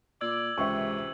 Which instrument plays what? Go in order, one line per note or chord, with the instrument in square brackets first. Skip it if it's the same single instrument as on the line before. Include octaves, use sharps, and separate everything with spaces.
[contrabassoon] A#2 [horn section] D5 [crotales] E6 G#6 F#7
[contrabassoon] C#2 [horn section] C3 E3 [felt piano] E5 G5 C#6